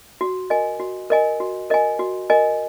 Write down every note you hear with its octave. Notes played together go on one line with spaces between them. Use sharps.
F#4
A#4 D#5 G#5
F#4
A#4 D#5 G#5
F#4
A#4 D#5 G#5
F#4
A#4 D#5 G#5